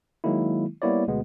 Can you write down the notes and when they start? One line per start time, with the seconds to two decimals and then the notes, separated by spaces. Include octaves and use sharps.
0.24 D#3 F#3 G#3 A#3 E4
0.82 G3 A#3 B3 E4 C#5 D5
1.07 D2 B2 G#3 B3